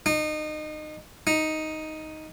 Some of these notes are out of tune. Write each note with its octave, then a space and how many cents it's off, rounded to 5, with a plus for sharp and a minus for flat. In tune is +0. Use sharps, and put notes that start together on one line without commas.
D#4 -25
D#4 +5